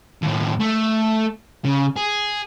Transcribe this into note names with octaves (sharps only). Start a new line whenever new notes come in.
D#2 A2
A3
C#3
G#4